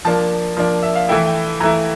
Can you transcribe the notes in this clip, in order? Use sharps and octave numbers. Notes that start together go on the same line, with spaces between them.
F3 A#3 D4 A5
F3 A#3 D4
E5
F5
E3 A3 E4 G5
G5
E3 A3 E4 A#5